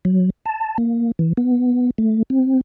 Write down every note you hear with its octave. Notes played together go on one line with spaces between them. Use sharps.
F#3
A5
A#3
E3
B3
A3
C4